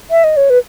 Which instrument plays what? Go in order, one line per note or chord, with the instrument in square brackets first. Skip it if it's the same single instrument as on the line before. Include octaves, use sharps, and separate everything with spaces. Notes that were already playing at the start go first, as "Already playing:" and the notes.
[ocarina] E5
D#5
C#5
B4